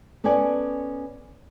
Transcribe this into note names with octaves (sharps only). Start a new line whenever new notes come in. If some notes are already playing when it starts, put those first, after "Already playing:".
B3 C#4 A4 D5 G#5